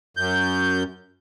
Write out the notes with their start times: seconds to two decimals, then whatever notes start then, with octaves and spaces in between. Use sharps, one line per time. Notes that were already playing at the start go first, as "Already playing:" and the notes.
0.17 F#2 G6